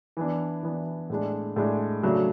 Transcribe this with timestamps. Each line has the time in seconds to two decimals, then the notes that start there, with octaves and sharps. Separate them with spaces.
0.17 E3 B3 D4
0.63 E3 B3 D4
1.10 A2 G#3 D4
1.56 A2 G#3 D4
2.03 C#3 F#3 A3 D4